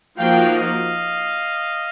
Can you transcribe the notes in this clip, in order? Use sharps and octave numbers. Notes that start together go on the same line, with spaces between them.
F3 A#3 D#4 F#4 F5 G5
D#5 F5